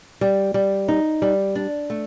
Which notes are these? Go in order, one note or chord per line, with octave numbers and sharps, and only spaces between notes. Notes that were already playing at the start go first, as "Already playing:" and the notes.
G3
G3
D#4
G3
D4
A3